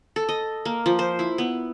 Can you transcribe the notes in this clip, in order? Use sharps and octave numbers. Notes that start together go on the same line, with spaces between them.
A4
D#5
A#3
F3
C5
E4
B3